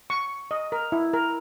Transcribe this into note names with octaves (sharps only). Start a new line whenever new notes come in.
C#6
D#5
A#4
E4
A#4